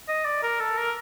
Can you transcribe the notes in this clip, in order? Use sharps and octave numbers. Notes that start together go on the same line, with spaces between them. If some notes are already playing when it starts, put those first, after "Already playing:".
D#5
D5
A#4
A4
A#4